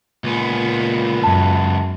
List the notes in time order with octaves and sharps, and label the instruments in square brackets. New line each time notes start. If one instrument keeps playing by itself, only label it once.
[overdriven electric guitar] C#2 B3 [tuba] A#2
[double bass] F#2 [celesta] A5